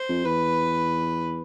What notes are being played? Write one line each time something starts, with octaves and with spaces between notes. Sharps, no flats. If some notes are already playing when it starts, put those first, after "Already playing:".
Already playing: C5
F2
E2 B4